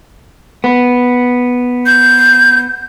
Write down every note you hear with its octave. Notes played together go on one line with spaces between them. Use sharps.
B3
G6